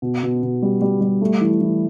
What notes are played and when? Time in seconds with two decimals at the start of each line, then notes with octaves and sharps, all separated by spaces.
0.02 B2
0.23 B2
0.43 B2
0.62 G3
0.81 G3
1.01 G3
1.22 A3
1.41 E3
1.61 E3